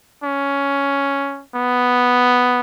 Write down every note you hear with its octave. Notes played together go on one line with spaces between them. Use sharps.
C#4
B3